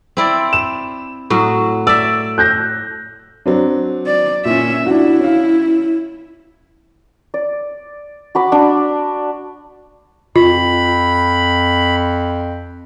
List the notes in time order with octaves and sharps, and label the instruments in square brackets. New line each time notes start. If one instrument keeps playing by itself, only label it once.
[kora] C4 E4 D5
[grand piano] E7
[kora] A2 F#3 F#4
[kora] D5 E5 [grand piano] E6
[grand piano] F#6 G6 A#6
[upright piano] F#3 C4 D4
[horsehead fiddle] D5
[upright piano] A#2 [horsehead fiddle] C#4 E5
[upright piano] D4 F#4 [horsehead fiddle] E4
[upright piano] C#4 F5
[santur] D5
F#4 B5 D6
D4
[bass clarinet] F2 [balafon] F4 [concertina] B5